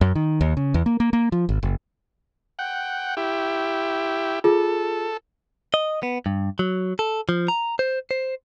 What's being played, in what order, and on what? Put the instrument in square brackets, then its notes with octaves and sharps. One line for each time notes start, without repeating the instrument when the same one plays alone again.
[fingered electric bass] F#2
D#3
D#2
C#3
E2
A#3
A#3
A#3
F3
G#1
F#1
[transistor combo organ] F#5 G5
E4 G4
[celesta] F4 G#4 [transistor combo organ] A4
[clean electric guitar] D#5
B3
G2
F#3
A4
F3
A#5
C5
C5